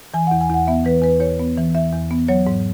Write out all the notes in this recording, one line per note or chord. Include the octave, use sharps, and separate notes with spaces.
E3 G#5
E2 F#5
G#5
E2 F#5
B3 E5
E3 B4
E2 B4
E2 C#5
B3
E3
E2 E5
E2
B3
F#3 C#5
G#2